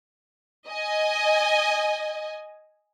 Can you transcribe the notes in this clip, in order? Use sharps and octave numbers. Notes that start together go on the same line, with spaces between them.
D#5 G#5